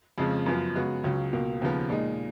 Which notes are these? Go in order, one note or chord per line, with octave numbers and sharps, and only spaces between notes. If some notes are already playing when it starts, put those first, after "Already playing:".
F2 C#3 F3 G#3
F#2 F3 B3 F4
C#3 G#3 B3 F#4
C#2 C#3 F#3
C#2 B2 A#3
D#2 C#3 F3 B3
A#2 G#3 D#4